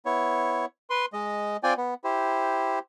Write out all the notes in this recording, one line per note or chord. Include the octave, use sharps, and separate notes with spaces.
B3 E4 C#5
B4 C6
G#3 D#5
C4 F4 D5 G5 G#5
B3
E4 G4 C5